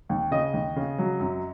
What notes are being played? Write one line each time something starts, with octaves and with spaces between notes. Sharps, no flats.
D#2
C#3 D#5
D#2
C#3
F#3
F#2